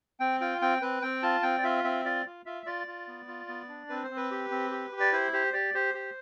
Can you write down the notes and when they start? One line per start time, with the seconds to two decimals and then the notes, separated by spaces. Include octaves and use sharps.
0.20 C4 G5
0.41 F4 G5
0.62 C4 G5
0.82 C4 B4
1.02 C4 G5
1.23 F4 A5
1.43 C4 G5
1.58 D5
1.63 F4 E5
1.84 C4 E5
2.05 F4 D5
2.26 F4
2.46 F4 E5
2.66 F4 D5
2.87 F4
3.07 B3
3.28 F4
3.48 B3
3.69 D4
3.89 C4 B4
4.03 C5
4.10 C4
4.16 B4
4.31 G4
4.51 C4
4.71 G4
4.92 G4
5.00 D5
5.12 E4 C5
5.33 G4 C5
5.53 G4 D5
5.74 G4 C5
5.94 G4